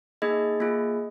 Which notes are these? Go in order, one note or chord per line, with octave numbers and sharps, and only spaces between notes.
A#3 D#4 G#4 D#5
A#3 F4 G#4